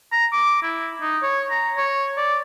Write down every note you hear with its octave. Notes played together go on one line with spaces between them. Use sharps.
A#5
D6
E4
D#4
C#5
A#5
C#5
D5